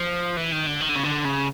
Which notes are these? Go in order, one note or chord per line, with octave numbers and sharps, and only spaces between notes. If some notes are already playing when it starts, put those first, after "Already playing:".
Already playing: F3
E3
D#3
D3
D#3
D3
C#3
D3
C#3